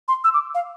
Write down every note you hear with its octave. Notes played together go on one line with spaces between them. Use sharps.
C6
E6
D6
F5